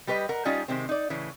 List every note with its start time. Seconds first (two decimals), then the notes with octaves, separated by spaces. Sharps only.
0.07 G3 G4 B4 C#5 D#5
0.29 A#4 F#5
0.45 G3 C#4 D#4 F4 D#5
0.68 C3 D#3 G#3 C4
0.89 D#4 D5
1.10 A2 C#3 E3